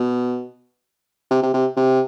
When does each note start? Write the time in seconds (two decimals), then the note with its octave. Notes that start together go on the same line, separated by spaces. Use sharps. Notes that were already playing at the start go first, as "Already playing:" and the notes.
Already playing: B2
1.31 C3
1.43 C3
1.54 C3
1.77 C3